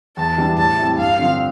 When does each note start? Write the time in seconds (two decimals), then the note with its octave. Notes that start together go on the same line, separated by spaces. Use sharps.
0.17 E2 A5
0.38 E3 G3 D4
0.57 A2 A5
0.78 G3 C4 E4
0.98 G2 F5
1.19 D3 F3 C4